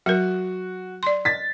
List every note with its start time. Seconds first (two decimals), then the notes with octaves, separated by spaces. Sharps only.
0.06 F#3 F#4 A#4
1.03 D5 C6
1.25 A6 B6